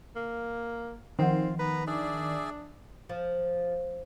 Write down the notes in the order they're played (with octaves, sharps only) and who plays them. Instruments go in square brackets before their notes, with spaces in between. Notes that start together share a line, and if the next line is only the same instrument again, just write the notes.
[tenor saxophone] A#3
[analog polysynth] D#3 [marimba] F3 F#5 [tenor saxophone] C4 [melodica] F4
[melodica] B3 A#5 [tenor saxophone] B4
[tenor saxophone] D4 [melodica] G#4 D5 E5
[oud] F3